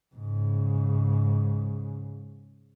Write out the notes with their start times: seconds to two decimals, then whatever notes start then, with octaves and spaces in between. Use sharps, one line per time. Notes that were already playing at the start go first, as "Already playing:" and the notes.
0.15 G#2 C#3